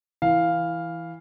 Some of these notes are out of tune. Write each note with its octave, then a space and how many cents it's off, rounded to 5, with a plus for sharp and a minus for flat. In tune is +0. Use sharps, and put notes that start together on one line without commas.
E3 +0 F5 +0